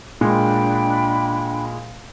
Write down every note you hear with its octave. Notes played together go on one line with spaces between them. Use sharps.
A#2 G#3 D4 G5 B5